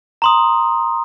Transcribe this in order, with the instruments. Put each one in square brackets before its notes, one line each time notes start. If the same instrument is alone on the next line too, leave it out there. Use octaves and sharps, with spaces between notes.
[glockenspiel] A#5 C6 D#6